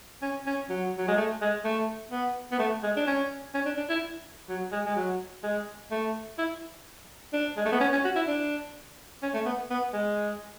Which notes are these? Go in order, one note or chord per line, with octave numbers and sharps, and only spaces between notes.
C#4
C#4
F#3
F#3
G#3
A3
G#3
A3
B3
B3
A3
G#3
D4
C#4
C#4
D4
D4
E4
F#3
G#3
G#3
F#3
G#3
A3
E4
D4
G#3
A3
B3
C#4
C#4
F#4
E4
D4
C#4
A3
B3
B3
G#3